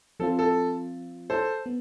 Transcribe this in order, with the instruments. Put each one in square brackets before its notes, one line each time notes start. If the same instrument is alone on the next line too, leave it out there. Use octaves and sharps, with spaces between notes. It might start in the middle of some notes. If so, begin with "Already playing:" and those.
[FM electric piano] F3 C4 F4 [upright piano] A4
[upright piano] A4
A4 C5
[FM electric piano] B3